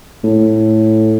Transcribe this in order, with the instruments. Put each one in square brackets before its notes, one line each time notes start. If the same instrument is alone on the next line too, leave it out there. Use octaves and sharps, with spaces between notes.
[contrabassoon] A2